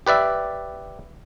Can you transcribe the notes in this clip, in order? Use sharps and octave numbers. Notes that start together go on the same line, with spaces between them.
G4 B4 D5 E5